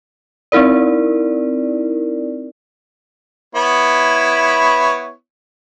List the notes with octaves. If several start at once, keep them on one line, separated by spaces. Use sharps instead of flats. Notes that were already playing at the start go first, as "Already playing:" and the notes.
C4 D#4 E4 A#4 D5
B3 E4 C#5